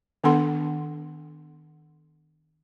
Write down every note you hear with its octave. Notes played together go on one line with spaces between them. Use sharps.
D#3 B3 D4 A4 F#5 C6